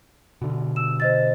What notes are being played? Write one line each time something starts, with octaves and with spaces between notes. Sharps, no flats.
B2 D3
E6 E7
C5 D#5 A6